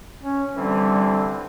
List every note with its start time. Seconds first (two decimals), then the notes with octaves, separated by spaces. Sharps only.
0.23 C#4
0.55 D3 E3 G3 C4